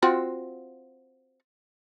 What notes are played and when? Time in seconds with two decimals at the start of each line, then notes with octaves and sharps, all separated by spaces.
0.02 C4 F4 F#4